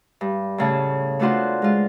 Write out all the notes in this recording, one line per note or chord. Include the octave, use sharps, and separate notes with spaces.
G2
A2 C#3 A5
A3 B3 D4 F4 F#4 C5
G#3 F4